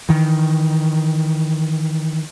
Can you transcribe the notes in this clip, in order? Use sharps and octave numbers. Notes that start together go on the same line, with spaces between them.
D#3 E3